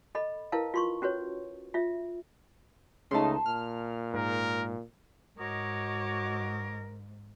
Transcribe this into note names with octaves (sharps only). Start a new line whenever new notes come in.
A4 D#5 B5
E4 A#4 B4 F5 A5
F4 C6 C#6
C#4 F#4 B4 C#5
F4 E5
C#2 C#3 A3 D#4 A5 C6
A#2 F6
G#2 A#4
G#2 F#4 A#4 C#5 D#5 D6